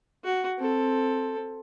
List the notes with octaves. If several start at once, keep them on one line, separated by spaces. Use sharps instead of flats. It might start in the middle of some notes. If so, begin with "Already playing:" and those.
F#4
C4 A4